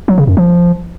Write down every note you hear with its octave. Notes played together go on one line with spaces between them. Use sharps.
F#3
C#3
F#2
F3